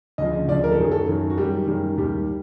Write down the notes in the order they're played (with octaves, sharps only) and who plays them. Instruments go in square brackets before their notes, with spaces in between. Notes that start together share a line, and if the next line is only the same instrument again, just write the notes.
[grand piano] D2 C#3 F3 D#5
D#5
D2 C#3 F3 D5
A#4
A4
F#2 D#3 F#3 G#4
A4
F#2 D#3 F#3
F#4
F#2 D#3 G3 G4
F#2 D#3 G3
D#2 D#3 G3 G4